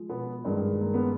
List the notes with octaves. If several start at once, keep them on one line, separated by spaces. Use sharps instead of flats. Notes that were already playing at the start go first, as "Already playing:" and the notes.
Already playing: F3 G#3
B2 B3
G2 D#3 G#3
A#3
B3